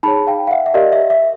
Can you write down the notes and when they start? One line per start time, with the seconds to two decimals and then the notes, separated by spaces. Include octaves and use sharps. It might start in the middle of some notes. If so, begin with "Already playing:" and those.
0.03 D#4 G#4 C#5 A5 B5
0.27 F5 G5
0.47 F5
0.51 E5 F#5
0.66 E5
0.74 G4 A#4 D5 D#5 F5
0.92 E5
1.10 E5